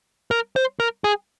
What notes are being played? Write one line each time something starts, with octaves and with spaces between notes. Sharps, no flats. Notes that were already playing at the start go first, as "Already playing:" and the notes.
A#4
C5
A#4
G#4